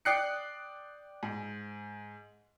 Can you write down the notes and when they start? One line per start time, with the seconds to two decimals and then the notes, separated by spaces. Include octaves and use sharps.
0.05 D5 G5 D#6 F#6 C7 C#7
1.23 G#2